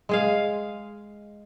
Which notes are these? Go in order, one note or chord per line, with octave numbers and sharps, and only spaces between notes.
G#3 G#4 F5